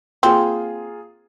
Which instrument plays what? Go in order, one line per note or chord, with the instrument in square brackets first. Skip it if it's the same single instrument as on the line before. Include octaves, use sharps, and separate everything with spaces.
[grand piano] A#3 F4 G#4 [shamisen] C4